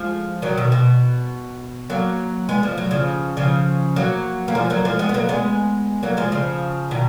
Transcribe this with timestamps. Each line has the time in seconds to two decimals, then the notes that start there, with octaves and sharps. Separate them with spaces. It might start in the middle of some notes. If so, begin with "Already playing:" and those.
Already playing: F3 G#3
0.42 D#3 F#3
0.57 B2 D#3
0.72 B2
1.90 F#3 A#3
2.49 G#3 B3
2.63 F3
2.78 F#3
2.91 C#3 F3
3.37 C#3 F3
3.96 F#3 A#3
4.48 A#3
4.55 F3 G#3
4.70 F#3 A#3
4.85 F3 G#3
4.99 G#3 B3
5.09 B3
5.14 F#3 A#3
5.29 G#3 B3
6.03 F#3 A#3
6.17 F3 G#3
6.32 C#3 F3
6.91 B2 D#3